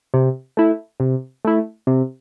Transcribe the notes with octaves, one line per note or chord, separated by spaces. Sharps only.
C3
A3 E4
C3
A3 E4
C3